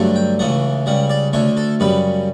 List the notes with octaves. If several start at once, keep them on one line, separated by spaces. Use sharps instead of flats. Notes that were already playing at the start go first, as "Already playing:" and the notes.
Already playing: G2 D3 F#3 A3
G5
C#2 C#3 E3 A3 F#5
C#2 C#3 G3 F#5
D5
D2 D3 A3 C#5
A4
F#2 C#3 G3 B4